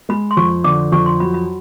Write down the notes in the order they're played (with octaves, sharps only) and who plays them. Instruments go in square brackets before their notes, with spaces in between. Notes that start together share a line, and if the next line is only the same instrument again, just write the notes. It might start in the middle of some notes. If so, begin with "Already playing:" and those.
[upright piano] G#3 [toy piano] B5
[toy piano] C6
[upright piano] F2 [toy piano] C#6
[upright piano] D3 [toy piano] D6
[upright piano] F2 [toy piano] C#6
[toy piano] C6
[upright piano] F#3 [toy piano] B5
[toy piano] B5